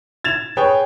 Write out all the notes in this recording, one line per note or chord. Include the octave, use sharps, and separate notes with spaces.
G#6 A6 E7 F7
G#4 B4 C#5 G5